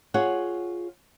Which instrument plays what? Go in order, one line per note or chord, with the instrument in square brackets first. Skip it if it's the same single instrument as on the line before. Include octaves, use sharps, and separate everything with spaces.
[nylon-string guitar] F4 G#4 C#5 F#5